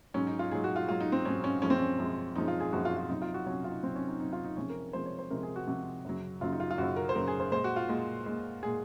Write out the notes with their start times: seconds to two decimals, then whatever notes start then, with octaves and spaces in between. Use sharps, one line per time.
0.14 G#2 F#3 C#4
0.27 D#4
0.39 F4
0.51 G#2 F#3 G#4
0.64 F#4
0.76 F4
0.88 G#2 F#3 F4
1.00 D#4
1.12 C4
1.25 G#2 F#3 C#4
1.44 C#4
1.62 F#2 F3 G#3 C#4
1.70 C4
1.79 C#4
1.99 F#2 F3 G#3
2.36 F#2 F3 G#3 D#4
2.48 F4
2.60 G#4
2.73 F#2 F3 G#3 F#4
2.85 F4
2.97 F4
3.09 C3 F#3 D#4
3.22 F4
3.34 F#4
3.46 C3 F#3 C#4
3.64 F4
3.71 D#4
3.83 C3 F#3 C4
3.96 C#4
4.08 D#4
4.20 C3 F#3 D#4
4.33 F4
4.45 D#4
4.57 C3 F3 G#3 C#4
4.70 A#4
4.93 C3 F3 G#3 C5
5.06 C#5
5.19 C5
5.30 C3 F3 G#3 A#4
5.43 G#4
5.56 F#4
5.67 C3 F3 G#3 F#4
6.05 F#2 C#3 F#3
6.41 F#2 C#3 F#3 F4
6.53 D#4
6.60 F4
6.71 F4
6.78 F#2 C#3 F#3 F#4
6.96 A#4
7.09 C5
7.15 F#2 C#3 F#3 A#4
7.28 G#4
7.40 C5
7.52 A#2 G#3 C5
7.64 F#4
7.76 F4
7.89 A#2 G#3
8.26 A#2 G#3
8.63 A#2 G#3 G#4